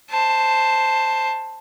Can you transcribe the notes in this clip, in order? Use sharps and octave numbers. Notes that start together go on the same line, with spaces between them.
C5 A5